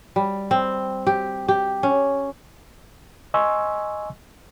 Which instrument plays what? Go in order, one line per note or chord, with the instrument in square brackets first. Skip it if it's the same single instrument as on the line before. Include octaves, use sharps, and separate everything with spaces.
[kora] G3
C4
G4
G4
C#4
[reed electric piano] D#5 G#5 C6 C#6 E6